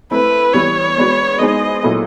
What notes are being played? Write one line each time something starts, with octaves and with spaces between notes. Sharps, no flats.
A3 C4 E4 B4
E3 G3 B3 C#5
G#3 B3 D4 F#4 B4
G#3 B3 D#4 G#4 C5 D#5
A#2 F#3 B3 E4 A4